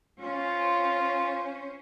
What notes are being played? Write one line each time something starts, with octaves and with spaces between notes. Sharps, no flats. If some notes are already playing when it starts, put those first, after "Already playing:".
C#4 F4 C5